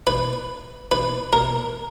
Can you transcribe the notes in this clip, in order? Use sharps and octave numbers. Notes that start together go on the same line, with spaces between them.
B4
B4
A#4